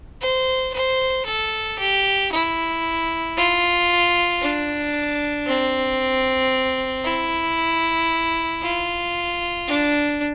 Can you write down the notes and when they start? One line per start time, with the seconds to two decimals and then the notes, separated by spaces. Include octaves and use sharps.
0.21 C5
0.74 C5
1.26 A4
1.79 G4
2.32 E4
3.37 F4
4.42 D4
5.47 C4
7.04 E4
8.62 F4
9.68 D4